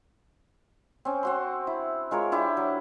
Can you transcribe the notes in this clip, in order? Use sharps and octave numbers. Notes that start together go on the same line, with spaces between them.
C4 C#4
C4 F#4 C6
E4
G#3 F4 A#4 C#5
D4 E4 G4 C5
F#3